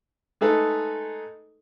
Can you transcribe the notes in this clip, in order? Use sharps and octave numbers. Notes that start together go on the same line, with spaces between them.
G#3 A3 D#4 G#4 A4 B4